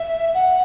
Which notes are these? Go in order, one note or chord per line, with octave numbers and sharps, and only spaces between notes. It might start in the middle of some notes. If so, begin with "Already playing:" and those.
Already playing: E5
F#5